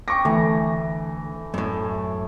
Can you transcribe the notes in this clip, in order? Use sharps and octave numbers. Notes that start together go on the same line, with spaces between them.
G5 C#6 D6 A#6
D2 E3 A3
F#2 A2